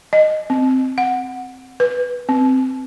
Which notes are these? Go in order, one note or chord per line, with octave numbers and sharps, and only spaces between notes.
D#5
C4
F#5
B4
C4